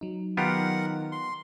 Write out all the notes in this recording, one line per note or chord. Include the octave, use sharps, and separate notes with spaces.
F#3 D#4
D#3 B3 F4 G4 A#4 F#5
C6